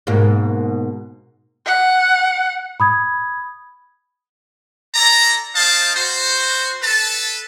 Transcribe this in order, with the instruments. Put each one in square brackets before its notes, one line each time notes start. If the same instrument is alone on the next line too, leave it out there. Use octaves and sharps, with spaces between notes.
[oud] G#2 B2 A#3
[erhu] F#5
[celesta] B5 D#6 G#6
[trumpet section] E4 A4 D5 A#5
C4 D#4 C5 D#5 F5 A5
F#4 C5
A4 B4 A5